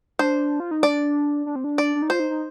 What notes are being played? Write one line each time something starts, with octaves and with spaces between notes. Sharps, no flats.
D4 C5
F4
D#4
D4 D5
D4
C4
D4
D5
D4
D#4
F4 C5
D#4
D#4